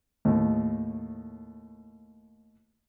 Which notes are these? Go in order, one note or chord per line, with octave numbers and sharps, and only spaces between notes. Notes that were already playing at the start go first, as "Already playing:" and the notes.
D#2 A2